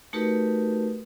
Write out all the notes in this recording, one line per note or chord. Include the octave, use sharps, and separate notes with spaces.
A3 D#4 F#4 G4 A#4 B4